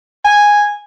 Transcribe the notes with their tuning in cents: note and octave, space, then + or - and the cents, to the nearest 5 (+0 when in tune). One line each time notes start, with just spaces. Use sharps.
G#5 -5